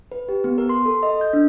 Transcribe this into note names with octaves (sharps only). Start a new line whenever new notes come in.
B4
G4
B3
A#4
C6
A4
D#5
G6
D4